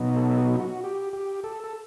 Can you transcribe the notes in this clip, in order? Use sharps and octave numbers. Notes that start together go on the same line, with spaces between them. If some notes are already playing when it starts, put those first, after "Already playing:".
Already playing: B2 F#3 B3 D#4
A4
F#4
F#4
G4
G4
A4
A4